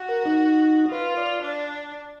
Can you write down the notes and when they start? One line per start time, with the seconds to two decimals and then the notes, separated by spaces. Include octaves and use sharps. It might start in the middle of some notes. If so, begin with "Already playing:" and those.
Already playing: F#4
0.09 A#4
0.25 D#4
0.91 F4 B4
1.17 D5
1.42 D4